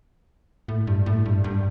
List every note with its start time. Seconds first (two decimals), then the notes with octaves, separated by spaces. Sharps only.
0.68 A2
0.87 G2
1.06 A2
1.25 G2
1.44 G2